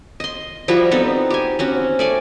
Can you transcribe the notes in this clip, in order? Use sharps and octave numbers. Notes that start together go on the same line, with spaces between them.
D#5 C6
F3 G3 E4 F#4
B3 C4 D#4 A4
G4 G#5
C4 C#4 F#4
A3 D5 G#5